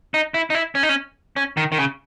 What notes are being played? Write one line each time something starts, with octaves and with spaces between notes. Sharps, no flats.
D#4
E4
D#4
E4
C#4
D#4
C#4
C#4
D#3
D#3
C#3